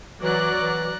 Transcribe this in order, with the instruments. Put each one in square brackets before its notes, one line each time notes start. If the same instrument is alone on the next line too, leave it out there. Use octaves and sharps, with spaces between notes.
[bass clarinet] E3 [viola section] F#3 D5 [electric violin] A#5 F#6
[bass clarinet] E3